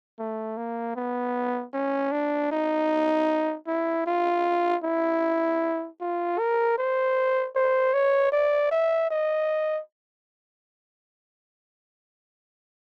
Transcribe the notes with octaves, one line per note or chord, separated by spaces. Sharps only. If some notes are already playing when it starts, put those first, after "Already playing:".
A3
A#3
B3
C#4
D4
D#4
E4
F4
E4
F4
A#4
C5
C5
C#5
D5
E5
D#5